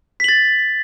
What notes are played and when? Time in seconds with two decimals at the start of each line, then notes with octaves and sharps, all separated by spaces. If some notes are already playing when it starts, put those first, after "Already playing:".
0.20 B6
0.24 F#7
0.29 A6